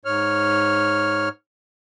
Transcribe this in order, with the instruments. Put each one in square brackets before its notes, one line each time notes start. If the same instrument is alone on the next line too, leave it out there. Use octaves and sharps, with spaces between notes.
[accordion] G#2 C#5 F6